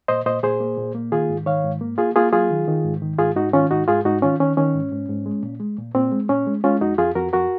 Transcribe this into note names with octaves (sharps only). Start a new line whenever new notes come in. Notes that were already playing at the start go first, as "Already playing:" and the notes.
A#2 C5 D#5
A#2 C5 D#5
A#2 G#4 C5
A#3
A#2
A#3
D#3 F4 G#4
G#2
D#3 C#5 F5
G#2
A#3
A#3 F4 G#4
A#3 F4 G#4
F#3 F4 G#4
D#3
D#3
G#2
D#3
G#2 F4 G#4
G#2 D#4 F#4
D#3 C#4 F4
G#2 D#4 F#4
G#2 F4 G#4
G#2 D#4 F#4
D#3 C#4 F4
D#3 C#4
D#3 C#4
G#2
G#2
G#2
G#3
A#2
G#3
A#2
A#2 C4
G#3
A#2 C#4
G#3
G#3 C#4 F4
F2 D#4 F#4
F2 F4 G#4
F2 F#4 A#4
F2 F#4 A#4